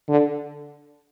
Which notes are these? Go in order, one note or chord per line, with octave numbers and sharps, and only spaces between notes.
D3